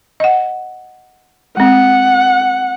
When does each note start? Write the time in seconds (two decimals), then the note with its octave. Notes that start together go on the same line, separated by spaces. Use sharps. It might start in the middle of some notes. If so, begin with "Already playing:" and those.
0.20 D#5 F#5
1.57 G#3 C4 F#5